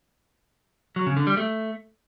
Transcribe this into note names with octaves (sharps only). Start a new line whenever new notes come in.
F#3
C#3
D3
G3
A3